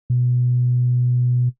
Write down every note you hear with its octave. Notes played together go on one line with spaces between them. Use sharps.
B2